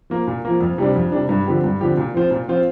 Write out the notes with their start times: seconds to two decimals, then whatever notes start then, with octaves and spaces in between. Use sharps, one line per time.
0.10 F3 A#3
0.27 A#2
0.45 F3 A#3
0.61 F2
0.78 C3 G3 D4
0.96 F2
1.12 C3 G3 D4
1.29 G2
1.46 D3 F3 C4 G4
1.64 G2
1.81 D3 F3 C4 G4
1.97 A#2
2.14 F3 C4 F4 C5
2.31 A#2
2.48 F3 C4 F4 C5